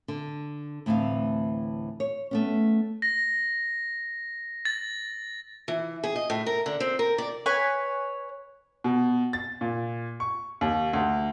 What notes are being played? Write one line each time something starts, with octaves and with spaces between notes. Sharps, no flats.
D3
D2 A2 E3 C4 F5
C#5
A3 B3 C#4
A#6
A6
E3
G#4
D#5
A2
A#4
D3
C4
A#4
D5
B4 C#5 G#5
B2
A6
A#2
C#6
D#2
D2